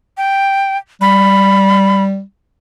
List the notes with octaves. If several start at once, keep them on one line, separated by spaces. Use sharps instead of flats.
G5
G3 B5